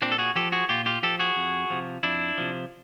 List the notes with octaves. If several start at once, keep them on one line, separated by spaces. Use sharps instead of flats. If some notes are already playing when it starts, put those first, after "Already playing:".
A#2 C4 D4
A4
F#4 G#4
F3 G4 A4
F#4 G#4
A#2 F4 G4
F4 G4
F3 G4 A4
F#4 G#4
F2
C3 F3
F2 D4 E4
C3 F3